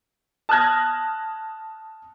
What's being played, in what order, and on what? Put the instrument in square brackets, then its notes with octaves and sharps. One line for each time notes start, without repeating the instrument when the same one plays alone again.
[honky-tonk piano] A5 D#6 F6 F#6 G#6 A#6